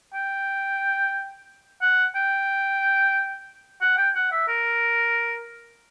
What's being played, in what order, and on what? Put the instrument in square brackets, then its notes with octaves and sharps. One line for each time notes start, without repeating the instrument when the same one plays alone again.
[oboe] G5
F#5
G5
F#5
G5
F#5
E5
A#4